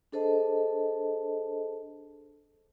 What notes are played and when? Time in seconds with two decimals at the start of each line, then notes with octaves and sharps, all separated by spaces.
0.12 D4 G#4 A4 C5 D#5 A5